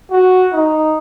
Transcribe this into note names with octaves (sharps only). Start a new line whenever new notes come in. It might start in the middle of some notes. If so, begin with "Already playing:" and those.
F#4
D#4